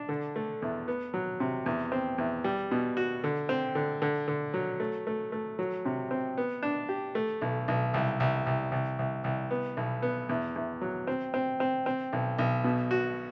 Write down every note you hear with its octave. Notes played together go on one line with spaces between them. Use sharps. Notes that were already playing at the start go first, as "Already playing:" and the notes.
Already playing: D4
D3
A3
E2
B3
F#3
C3
E2
C4
E2
G3
B2
F#4
D3
C4
D3
D3
D3
F#3
A3
A3
A3
F#3
C3
C4
B3
D4
G4
A3
B1
B1
C2
C2
C2
C2
C2
C2
B3
B1
B3
E2
E2
F#3
C4
C4
C4
C4
B1
B1
B2
F#4